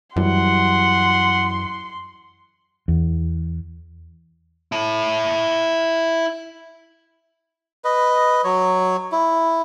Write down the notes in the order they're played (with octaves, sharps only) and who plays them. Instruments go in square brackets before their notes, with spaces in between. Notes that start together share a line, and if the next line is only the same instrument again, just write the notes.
[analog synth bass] F#2 [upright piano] E3 F#3 G3 [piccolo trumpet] F#5 [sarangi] C6
[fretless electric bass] E2
[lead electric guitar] E4 A5
[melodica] B4 D#5
F#3 C#5
E4